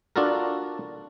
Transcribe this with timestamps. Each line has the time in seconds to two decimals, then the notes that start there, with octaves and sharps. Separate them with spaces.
0.16 D4 F4 F#4 A4 A#4